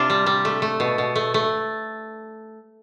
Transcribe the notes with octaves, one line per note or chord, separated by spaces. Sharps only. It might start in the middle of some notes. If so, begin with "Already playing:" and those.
Already playing: C3 C4 D4 F4
G3
G3
A3
A3
B2
B2
A3
A3